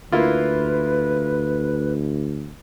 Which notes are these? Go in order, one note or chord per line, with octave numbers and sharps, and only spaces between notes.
D2 A#3 E4 F4 B4